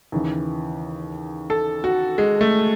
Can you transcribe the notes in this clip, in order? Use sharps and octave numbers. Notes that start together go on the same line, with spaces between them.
D#2 C#3 E3
A4
F#4
G#3
A3